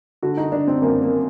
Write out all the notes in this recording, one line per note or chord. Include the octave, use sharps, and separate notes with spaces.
D3 F#4
D#4
D3 D4
C4
F#2 A#3
A#3